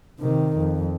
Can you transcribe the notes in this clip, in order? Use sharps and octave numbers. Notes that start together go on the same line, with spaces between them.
C3 D#3
F2